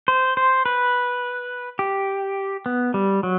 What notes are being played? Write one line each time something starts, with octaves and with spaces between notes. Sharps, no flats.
C5
C5
B4
G4
B3
G3
F#3